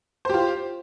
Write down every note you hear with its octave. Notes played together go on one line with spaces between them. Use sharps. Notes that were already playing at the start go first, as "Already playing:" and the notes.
F4 G4 C5